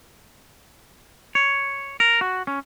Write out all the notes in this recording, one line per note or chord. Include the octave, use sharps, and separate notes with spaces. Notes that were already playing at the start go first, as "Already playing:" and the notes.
C#5
A#4
F#4
C#4